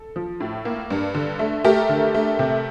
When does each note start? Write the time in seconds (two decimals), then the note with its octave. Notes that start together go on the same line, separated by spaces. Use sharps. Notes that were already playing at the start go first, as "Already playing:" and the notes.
Already playing: A4
0.16 F3
0.40 A2
0.65 A#3
0.90 G2
1.14 D3
1.39 A3
1.64 A3 G4 A#4
1.89 D3
2.14 A3
2.39 C3